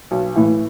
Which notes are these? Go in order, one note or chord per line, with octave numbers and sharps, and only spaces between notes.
B1
A2 E3